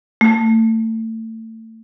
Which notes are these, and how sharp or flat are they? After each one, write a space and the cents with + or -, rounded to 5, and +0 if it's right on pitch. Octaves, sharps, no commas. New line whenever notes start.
A3 +30